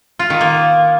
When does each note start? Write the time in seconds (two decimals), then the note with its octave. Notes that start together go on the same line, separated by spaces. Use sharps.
0.19 F4
0.30 D#3
0.41 A#3